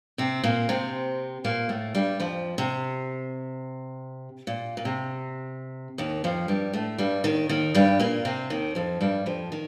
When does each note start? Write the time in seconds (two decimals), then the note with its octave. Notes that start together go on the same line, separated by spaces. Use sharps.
0.18 C3 C4
0.44 A#2 A#3
0.69 C3 C4
1.45 A#2 A#3
1.69 A2 A3
1.95 G2 G3
2.20 F2 F3
2.58 C3
4.47 A#2
4.77 A#2
4.85 C3
5.98 D#2 D#3
6.24 F2 F3
6.48 G2 G3
6.73 A2 A3
6.98 G2 G3
7.24 D#2 D#3
7.49 D#2 D#3
7.75 G2 G3
7.99 A#2 A#3
8.25 C3 C4
8.50 D#2 D#3
8.75 F2 F3
9.01 G2 G3
9.26 F2 F3
9.52 D#3